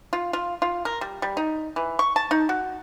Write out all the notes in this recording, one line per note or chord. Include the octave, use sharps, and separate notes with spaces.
F4
F4
F4
A#4
G3
G3
D#4
E3
C#6
A5
D#4
F#4